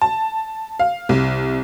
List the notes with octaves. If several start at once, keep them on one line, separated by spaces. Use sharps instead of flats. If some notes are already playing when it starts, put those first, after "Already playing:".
A5
F5
C2